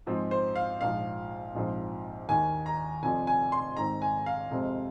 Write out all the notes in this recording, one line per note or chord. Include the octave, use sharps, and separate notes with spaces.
G#2 F3 G#3 C4
C5
F5
A#1 G#2 F3 F5
A#1 G#2 F3 C4
D#2 D#3 A#3 G#5
A#5
F1 F2 F3 G#5
G#5
C6
G#2 D#3 C4 A#5
G#5
F5
F2 C3 G#3 C4